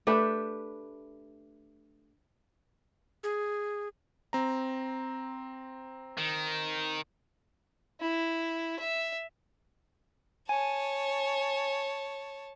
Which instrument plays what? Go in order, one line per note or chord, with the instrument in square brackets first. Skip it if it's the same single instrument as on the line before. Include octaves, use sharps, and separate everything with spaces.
[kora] A3 D4 G4 B4
[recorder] G#4
[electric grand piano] C4 A#5
[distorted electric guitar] D#3
[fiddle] E4
E5
[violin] C#5 A5 [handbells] G#5